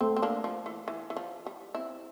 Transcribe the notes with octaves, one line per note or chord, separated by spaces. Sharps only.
A3 C4
C4
A#3 D4
F3
E3
E3
E3
F3
G3
C4 E4